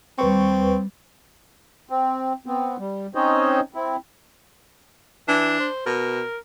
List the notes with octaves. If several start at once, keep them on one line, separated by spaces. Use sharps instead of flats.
D#2 G3 C4 B4 C#6
C4
B3 C4
G3
C4 C#4 D#4 C5 C#5 D#5
C4 E4
E3 D4
C5
B2 A#4